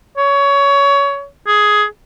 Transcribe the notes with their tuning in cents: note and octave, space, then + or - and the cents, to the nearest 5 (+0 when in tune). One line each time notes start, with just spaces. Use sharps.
C#5 +20
G#4 +10